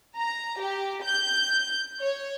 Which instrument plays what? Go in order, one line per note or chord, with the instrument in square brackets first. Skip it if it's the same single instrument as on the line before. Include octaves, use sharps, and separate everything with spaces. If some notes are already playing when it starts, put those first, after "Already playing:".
[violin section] A#5
G4
G6
C#5